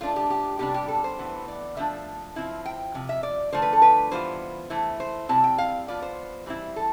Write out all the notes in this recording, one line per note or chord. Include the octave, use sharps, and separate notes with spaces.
F3 A3 D4 F4
G4
G4
C3 G3 B3 D4 G4
G4
A4
C5
A2 E3 B3
D5
F3 A3 D4 E5
F3 C4 E4
G5
C3 F3
E5
D5
D3 F3 A3 C5
B4
A4
B4
E3 G3 B3 F4 C5
E3 A3 E4
C5
C3 G3 C4 E4 A5
G5
F5
F3 B3 F4 D5
C5
E3 G3 C4 E4
A4